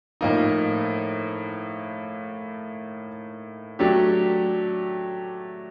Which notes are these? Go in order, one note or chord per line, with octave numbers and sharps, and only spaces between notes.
A2 F3 A#3 D#4
F#3 A3 D4 G4